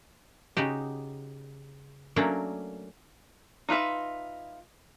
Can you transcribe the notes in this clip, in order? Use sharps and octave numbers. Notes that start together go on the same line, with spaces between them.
C#3 D#4 F#4 G4
F#3 A3 A#3 C#4 D4
D#4 F4 B4 E5